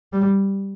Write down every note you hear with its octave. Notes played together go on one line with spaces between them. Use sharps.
G3